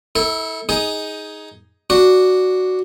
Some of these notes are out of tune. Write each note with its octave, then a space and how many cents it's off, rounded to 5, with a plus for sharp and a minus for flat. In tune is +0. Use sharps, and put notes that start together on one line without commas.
E4 -35 A4 +0
D#4 +15 G#4 +0
D4 +0 F#4 +0